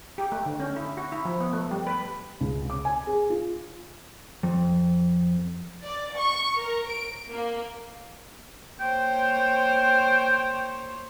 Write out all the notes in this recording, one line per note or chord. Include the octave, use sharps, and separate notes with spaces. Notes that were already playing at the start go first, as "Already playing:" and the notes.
G4
A3
D3
C#4
E4
F#4
E4
F3
B3
A3
G3
B4
C#2
D6
G#5
G#4
F4
F2
D5
C#6
A#4
D7
A#3
A#3 C5 C#5 G5